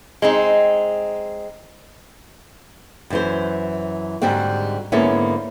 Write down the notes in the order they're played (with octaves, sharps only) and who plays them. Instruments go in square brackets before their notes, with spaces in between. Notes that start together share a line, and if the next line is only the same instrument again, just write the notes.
[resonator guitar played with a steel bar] G#3 C4 D#4
[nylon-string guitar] F#2 E3 C5
G#2 D3 G3 G#3 C4 F#4
G#2 D3 A#3 B3 C#4 E4